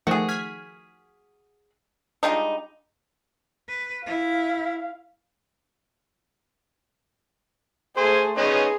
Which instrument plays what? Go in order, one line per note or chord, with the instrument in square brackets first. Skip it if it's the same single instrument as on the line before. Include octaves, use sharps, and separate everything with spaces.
[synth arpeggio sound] D#3 F3 A3 [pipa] F#4 G#4
[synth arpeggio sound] F6 G#6 B6
[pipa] G3 G#3 D#4 [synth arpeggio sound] D4 F4 D#5
[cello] B4
[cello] E4 [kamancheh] F5
[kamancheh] A3 G#4 [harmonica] C5 G#5 [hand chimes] C6
[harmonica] B3 C#4 D#4 [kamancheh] G#4